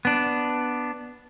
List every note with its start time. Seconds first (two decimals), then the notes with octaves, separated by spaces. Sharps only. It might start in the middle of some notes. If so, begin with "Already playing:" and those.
0.05 B3 D4